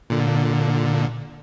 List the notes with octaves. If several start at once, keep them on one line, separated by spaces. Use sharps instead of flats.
A#2 D3